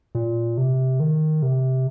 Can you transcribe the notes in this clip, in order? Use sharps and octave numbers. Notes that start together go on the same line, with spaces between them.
A#2
C3
D#3
C3